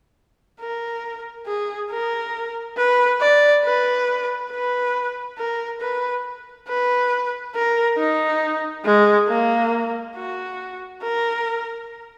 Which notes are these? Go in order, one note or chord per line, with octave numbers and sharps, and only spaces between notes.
A#4
G#4
A#4
B4
D5
B4
B4
A#4
B4
B4
A#4
D#4
G#3
A#3
F#4
A#4